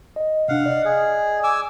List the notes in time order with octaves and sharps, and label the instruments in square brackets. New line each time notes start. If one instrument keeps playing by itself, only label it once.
[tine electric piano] D#5
[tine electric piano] C3 D4 [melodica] F5 F#5
[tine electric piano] D5 D#5
[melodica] G#4
G#5 D6 E6